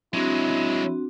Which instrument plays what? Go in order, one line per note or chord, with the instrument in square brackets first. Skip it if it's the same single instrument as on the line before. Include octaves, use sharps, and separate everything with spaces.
[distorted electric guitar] F#3 G#3 [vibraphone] C4 D4 F#4 [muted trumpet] E4